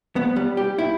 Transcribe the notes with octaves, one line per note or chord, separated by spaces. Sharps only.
B3
G3
G4
E4